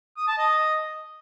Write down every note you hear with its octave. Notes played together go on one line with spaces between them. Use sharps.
D#6
A5
D#5